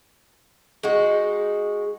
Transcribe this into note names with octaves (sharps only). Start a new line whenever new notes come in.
G#3 D#4 F#4